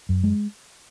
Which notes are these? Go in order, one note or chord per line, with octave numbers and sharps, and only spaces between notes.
F#2
G#3